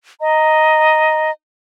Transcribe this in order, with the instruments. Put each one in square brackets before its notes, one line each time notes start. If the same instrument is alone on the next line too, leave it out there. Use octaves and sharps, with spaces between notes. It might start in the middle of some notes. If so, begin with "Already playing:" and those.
[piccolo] D#5 [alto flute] A#5